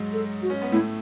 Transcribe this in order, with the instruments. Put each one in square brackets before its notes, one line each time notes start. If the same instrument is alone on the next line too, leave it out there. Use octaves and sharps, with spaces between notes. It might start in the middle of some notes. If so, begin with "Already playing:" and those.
Already playing: [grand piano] G#2 F#3 G#3
[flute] A4
F#4
[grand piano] C#4
B3
[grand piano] A2 A3 [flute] E4